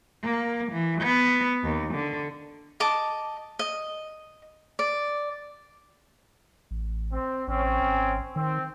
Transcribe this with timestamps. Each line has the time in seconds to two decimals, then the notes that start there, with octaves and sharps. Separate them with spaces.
0.24 A#3
0.72 E3
1.02 B3
1.64 D#2
1.95 D3
2.80 D#5 A5 D6
3.59 D#5
4.79 D5
6.71 A1
7.12 C4
7.48 A1 C4 C#4
7.81 G#1
8.36 D#3 C4